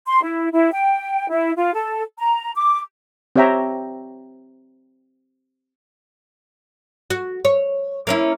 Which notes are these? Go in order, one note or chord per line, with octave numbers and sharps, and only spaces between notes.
C6
E4
E4
G5
E4
F4
A4
A#5
D6
C4 G4 C#5 E5 G5 A#5
F#4
C#5
A#3 C#4 E4